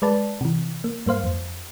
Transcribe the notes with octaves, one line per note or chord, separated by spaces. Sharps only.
G#3 B4 D5 A5
C3 E3
A#3
G2 A#3 C5 F5
F2